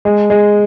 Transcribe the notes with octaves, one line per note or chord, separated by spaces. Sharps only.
G#3
G#3